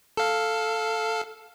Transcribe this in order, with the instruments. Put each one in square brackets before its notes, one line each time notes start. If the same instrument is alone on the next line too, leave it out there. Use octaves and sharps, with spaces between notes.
[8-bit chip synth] A4 F5